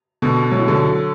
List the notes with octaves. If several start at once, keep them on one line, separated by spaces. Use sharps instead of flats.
B2 D3
F#3
E3
D3 F#3